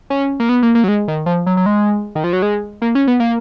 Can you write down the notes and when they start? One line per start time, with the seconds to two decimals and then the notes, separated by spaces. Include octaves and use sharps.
0.10 C#4
0.40 A#3
0.49 B3
0.63 A#3
0.75 A#3
0.84 F#3
0.88 G#3
1.08 D#3
1.26 F3
1.47 F#3
1.57 F#3
1.66 G#3
2.15 D#3
2.24 F3
2.33 F#3
2.42 G#3
2.82 A#3
2.95 C#4
3.07 B3
3.20 A#3